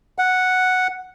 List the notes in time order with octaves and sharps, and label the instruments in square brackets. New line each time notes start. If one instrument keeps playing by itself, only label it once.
[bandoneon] F#5